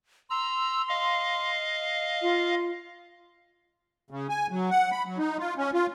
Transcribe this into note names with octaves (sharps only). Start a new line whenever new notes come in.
A#5 C6 E6
D#5 F5
F4
C#3
G#5
F#3
F#5
B5
F#3
D#4
F4
C#4
F4